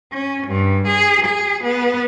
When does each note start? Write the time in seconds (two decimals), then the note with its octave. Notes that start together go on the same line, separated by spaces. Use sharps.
0.12 C#4
0.46 G2
0.87 G#4
1.24 G#4
1.63 B3